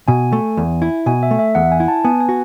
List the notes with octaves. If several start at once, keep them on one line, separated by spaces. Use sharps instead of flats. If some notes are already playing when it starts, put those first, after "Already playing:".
B2 G#5
A3
E2
E4
B2 G#5
E5
A3
E5
E2 F#5
G#5
E4
A5
B3 G#5
G#5
F#4